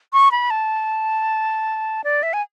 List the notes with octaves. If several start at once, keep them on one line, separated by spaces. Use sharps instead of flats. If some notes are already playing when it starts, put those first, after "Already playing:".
C#6
B5
A5
D5
E5
G#5